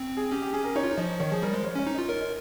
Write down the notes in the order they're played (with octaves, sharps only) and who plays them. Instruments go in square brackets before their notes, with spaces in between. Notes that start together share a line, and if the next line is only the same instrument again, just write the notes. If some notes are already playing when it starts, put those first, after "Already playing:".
Already playing: [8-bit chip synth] C4
[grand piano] G#4
[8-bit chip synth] C#4 [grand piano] G4
[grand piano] G4
[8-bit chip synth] C#4 [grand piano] G#4
[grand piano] A#4
[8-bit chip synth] D#4 [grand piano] C#5
[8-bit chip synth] F4
D#4
[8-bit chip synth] F3 [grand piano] D#5
[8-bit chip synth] D#3 [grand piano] C#5
[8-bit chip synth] F3 [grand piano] G#4
[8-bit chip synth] G3 [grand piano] A#4
[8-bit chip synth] G#3 [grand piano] C5
[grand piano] C#5
[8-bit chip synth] C#4 [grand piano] C#5
[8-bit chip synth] D#4
[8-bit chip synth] F4 [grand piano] D#5
[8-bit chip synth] A#4 [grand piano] C#5
[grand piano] D#5